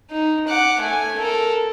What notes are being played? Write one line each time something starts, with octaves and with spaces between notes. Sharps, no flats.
D#4
F#5 D6
A3 G#5
A4 A#4